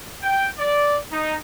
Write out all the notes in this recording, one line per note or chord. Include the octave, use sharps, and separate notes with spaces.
G5
D5
D#4